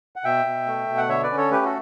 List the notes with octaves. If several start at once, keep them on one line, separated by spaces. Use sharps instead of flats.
F#5
B2 E5 G5
B2
A3
B2
F#5
D3 C#5 E5
B4 D5
C#4
A4 C#5
A3 G4 B4
F#4 A4